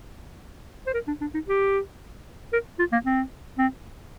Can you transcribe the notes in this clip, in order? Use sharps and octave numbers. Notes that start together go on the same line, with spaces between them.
C5
A#4
D4
D4
D#4
G4
A#4
F4
A#3
C4
C4